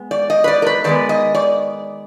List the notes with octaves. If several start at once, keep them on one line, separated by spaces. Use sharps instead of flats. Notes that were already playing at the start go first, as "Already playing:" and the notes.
Already playing: G#3 B3
D5
D#5
B4
D5
A#4
B4
D#3 G#3 B3 D5
D#5
D5